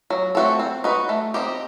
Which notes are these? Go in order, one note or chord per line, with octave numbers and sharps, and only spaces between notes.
F#3
A3 C4 F#4 A4
C4
D#4 F#4 B4
A3
C4 D#4 G4